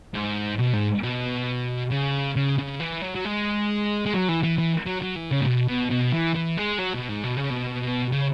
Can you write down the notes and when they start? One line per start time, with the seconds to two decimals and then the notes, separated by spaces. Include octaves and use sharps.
0.14 G#2
0.59 B2
0.74 G#2
1.03 B2
1.91 C#3
2.36 C#3
2.58 C#3
2.80 E3
3.02 F#3
3.15 F#3
3.25 G#3
4.06 G#3
4.14 F#3
4.28 E3
4.43 E3
4.58 E3
4.86 F#3
5.02 F#3
5.16 E3
5.31 C#3
5.41 G#2
5.47 B2
5.68 B2
5.90 B2
6.12 E3
6.35 E3
6.57 G#3
6.79 F#3
6.94 B2
7.09 G#2
7.24 B2
7.37 C#3
7.50 B2
8.12 C#3